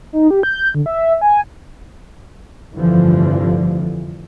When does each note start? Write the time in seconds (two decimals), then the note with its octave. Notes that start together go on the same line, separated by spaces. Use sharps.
0.13 D#4
0.31 G4
0.43 G6
0.75 D3
0.86 E5
1.21 G#5
2.73 F1 G2 D3 E3 F3